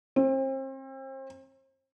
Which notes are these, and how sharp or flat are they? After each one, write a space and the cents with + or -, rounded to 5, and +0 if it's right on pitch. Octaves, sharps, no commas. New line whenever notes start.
C4 +35